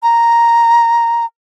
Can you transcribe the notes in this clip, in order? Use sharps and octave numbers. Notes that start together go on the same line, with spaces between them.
A#5